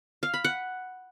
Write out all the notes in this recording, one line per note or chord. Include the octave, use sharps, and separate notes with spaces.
F5
B5
F#5